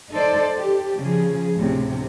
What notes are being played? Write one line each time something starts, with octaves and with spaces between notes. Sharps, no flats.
D#4 A4 C5 D5
G4
C#3 F3 G#4
D2 A2 C3